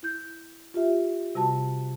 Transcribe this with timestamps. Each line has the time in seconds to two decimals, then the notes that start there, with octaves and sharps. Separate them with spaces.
0.03 E4 G6
0.74 F4 G4 E5
1.35 C3 G3 F#4 A5